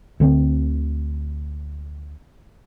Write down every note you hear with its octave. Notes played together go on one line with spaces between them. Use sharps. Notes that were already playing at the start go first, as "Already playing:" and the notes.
D2 D3 A#3 C4